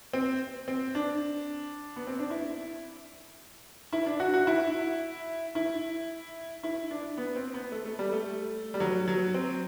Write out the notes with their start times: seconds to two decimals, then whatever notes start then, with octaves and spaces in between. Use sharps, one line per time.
0.13 C4
0.68 C4
0.95 D4
1.96 B3
2.07 C4
2.19 D4
2.30 E4
3.93 E4
4.06 D4
4.20 F#4
4.34 F#4
4.47 E4
5.55 E4
6.63 E4
6.91 D4
7.17 B3
7.36 C4
7.54 B3
7.72 A3
7.85 A3
7.99 G3
8.12 A3
8.74 G3
8.80 F#3
9.08 F#3
9.34 C4